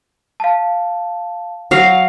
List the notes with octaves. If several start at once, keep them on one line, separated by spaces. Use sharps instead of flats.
F5 A5
F#3 F5